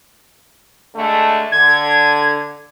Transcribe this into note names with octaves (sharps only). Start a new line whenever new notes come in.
D3 G#3 A3
D3 G#6